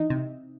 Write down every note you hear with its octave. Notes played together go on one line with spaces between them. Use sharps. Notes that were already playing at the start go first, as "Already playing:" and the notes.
Already playing: E3 D#4
C3